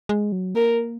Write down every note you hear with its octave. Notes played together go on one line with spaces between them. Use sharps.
G#3
F#3
A#3 A#4